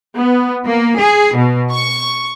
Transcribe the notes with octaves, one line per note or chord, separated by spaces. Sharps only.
B3
A#3
G#4
B2
C#6